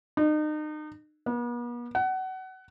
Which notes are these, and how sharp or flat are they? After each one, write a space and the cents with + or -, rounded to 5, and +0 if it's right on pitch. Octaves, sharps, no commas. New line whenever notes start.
D#4 -35
B3 -45
F#5 +25